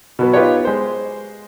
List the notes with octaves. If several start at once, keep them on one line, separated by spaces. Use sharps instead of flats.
B2 F#3 B3
B3 D#4 F4 G4 B4 C#5
G#3 C5